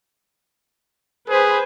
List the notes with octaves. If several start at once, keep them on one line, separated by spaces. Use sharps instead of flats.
G#4 B4 C5